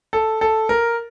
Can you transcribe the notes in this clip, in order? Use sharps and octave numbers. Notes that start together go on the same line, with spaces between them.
A4
A4
A#4